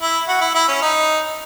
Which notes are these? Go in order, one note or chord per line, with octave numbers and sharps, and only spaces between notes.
E4
F#4
E4
E4
C#4
D#4